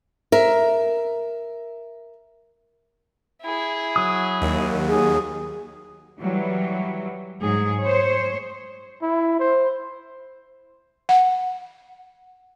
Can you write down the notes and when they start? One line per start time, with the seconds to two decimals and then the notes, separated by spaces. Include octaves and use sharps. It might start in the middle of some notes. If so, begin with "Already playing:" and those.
0.32 A#4 E5
3.42 E4 G#4
3.96 F#3 D#6
4.42 D#2
4.88 G#4
6.20 E3 F#3 G3
7.41 G#2 F#3 G#4
7.82 C5 C#5
9.03 E4
9.40 C5
11.09 F#5